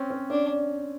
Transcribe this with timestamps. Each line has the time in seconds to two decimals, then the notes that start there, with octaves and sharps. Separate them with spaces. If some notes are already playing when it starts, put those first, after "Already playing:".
Already playing: C4 C#4
0.11 C#4
0.30 C#4 D4